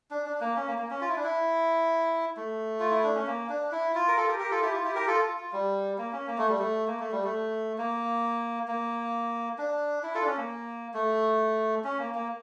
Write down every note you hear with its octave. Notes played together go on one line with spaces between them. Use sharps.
D4
D4
A#3
C#4
A#3
A#3
C#4
F4
E4
D4
E4
A3
F4
E4
D4
C#4
A#3
D4
E4
F4
A#4
F4 A4
G4 A#4
G4 A#4
F4 A4
E4 G4
F4
E4 G4
G4 A#4
F4 A4
F4
F4
G3
A#3
C#4
A#3
A3
G3
A3
A#3
A3
G3
A3
A#3
A#3
D4
E4
F4 A4
D4
C#4
A#3
A3
C#4
A#3
A#3